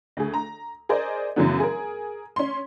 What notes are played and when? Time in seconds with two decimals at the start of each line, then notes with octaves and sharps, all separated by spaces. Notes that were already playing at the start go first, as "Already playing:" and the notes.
0.17 D2 G#4
0.34 A#5
0.89 G#4 A#4 C5 D5 D#5
1.36 F#2 C#3 E3 F#3 A3 B3
1.60 G#4 A#4
2.36 C#4 C6